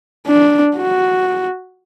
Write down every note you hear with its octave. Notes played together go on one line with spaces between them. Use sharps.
D4
F#4